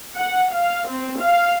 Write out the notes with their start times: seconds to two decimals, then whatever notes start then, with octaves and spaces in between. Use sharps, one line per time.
0.18 F#5
0.54 F5
0.88 C4
1.21 F5